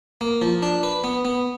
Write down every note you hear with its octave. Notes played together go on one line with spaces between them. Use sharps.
A#3
F3
D4
B4
B3
B3